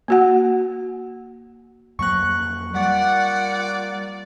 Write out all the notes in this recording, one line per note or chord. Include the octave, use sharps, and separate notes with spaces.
A#3 F#4 F#5
F2 F#3 A#3 C#6 F#6
G3 A#3 F4 D5 F#5